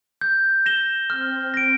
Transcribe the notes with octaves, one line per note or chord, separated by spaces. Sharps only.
G6
A#6 E7 G7
C4 F6
A#6 D7